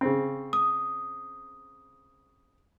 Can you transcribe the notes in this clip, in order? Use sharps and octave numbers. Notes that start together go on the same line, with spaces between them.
C#3 C4
D#6